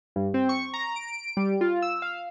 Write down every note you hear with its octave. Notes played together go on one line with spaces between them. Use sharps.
G2
C4
C#6
A#5
D7
G3
F4
E6
F5